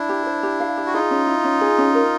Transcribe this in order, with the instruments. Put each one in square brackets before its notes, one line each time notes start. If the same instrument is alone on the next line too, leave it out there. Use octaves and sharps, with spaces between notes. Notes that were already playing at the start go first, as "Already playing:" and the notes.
Already playing: [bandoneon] D4 E4
[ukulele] G4
C5
G4
F5
G4
[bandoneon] F#4
[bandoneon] D#4 F4 [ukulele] G#4
[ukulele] C#4
E4
C#4
G#4
C#4
A#4